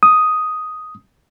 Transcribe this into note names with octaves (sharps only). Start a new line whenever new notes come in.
D#6